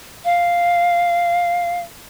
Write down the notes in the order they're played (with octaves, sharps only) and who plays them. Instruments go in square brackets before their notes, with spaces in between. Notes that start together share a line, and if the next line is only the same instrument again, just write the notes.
[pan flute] F5